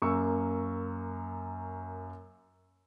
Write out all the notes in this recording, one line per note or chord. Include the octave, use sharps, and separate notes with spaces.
F#2 A#3 C#6 E6